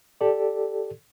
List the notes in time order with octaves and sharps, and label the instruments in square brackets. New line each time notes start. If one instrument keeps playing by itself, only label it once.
[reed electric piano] G4 A4 D5